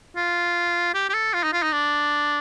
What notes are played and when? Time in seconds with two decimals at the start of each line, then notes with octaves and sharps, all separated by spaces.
0.16 F4
0.94 G4
1.09 G4
1.14 A4
1.33 F4
1.43 D#4
1.53 F4
1.63 D#4
1.72 D4